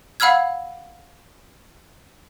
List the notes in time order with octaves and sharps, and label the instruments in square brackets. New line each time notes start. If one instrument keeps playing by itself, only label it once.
[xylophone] F5 F#5 B5 E6 F6 G#6